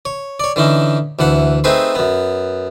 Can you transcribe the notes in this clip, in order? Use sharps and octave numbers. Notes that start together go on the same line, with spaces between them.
C#5
C#5 D5
D3 E3 C#4 D#4
D2 E3 F#5 A5
A3 C4 D#4 G#4 B4 C5
F#2 B3